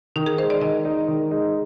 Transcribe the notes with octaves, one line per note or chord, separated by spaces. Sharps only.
D#3 D#4
G#4
G#3 D#4 C5
D5
D#3 D#5
G#3 D#4
D#3
G#3 D#4